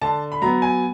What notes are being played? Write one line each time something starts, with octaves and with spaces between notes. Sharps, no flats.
D3 A5
B5
F#3 B3 A#5
G#5